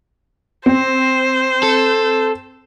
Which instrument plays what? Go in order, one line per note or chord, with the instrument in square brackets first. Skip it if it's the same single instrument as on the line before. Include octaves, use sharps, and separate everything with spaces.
[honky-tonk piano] C4 [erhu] C5
[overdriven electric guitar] A4